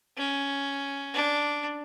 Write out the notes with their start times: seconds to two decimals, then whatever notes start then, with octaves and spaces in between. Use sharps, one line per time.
0.18 C#4
1.14 D4